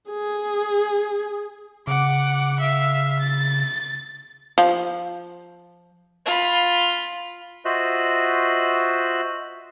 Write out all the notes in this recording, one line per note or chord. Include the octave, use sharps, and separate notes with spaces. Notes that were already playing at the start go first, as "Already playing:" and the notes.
G#4
C#3 F#5 D6
E5 F5
A6
F3
F4 B5
F4 F#4 C5 D#5 E5 F#6